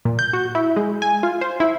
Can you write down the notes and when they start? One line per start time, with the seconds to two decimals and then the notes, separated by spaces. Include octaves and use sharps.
0.05 A#2
0.19 G6
0.33 F#4
0.55 E4
0.77 G#3
1.02 G#5
1.23 F4
1.41 C5
1.60 E4